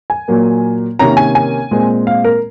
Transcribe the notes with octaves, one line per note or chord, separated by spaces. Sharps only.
G#5
A#2 F#3 A#3
C3 D#3 A#3 C#4 A#5
G#5
G#5
A#2 G#3 C4
F5
A#4